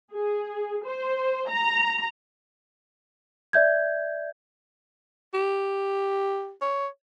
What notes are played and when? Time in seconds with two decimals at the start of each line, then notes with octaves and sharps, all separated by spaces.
0.13 G#4
0.85 C5
1.49 A#5
3.53 D5 E5 G6 G#6
5.34 G4
6.62 C#5